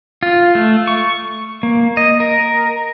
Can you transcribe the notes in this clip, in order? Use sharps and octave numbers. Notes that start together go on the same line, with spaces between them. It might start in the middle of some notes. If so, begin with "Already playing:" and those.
F4
A3
C#6
A#3
D#5
A#4